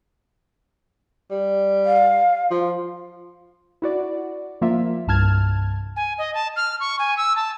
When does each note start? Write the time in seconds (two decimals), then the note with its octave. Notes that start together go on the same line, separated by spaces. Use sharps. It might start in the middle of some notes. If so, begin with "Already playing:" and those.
1.31 G3
1.85 F5
2.51 F3
3.82 E4 F#4 D5
4.61 F3 A#3 F4 E5
5.07 C2 G2 A5 F6 G#6
5.96 G#5
6.18 D#5
6.34 A5
6.56 F6
6.80 C#6
6.99 G#5
7.17 E6
7.36 A5